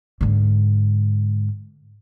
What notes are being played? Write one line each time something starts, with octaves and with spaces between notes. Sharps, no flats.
G#2 D3